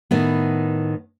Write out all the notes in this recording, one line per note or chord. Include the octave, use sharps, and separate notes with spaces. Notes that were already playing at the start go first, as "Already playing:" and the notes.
A2 D#3 B3